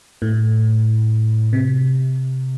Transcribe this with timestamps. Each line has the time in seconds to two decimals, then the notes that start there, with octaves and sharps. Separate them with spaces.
0.22 A2
1.53 C3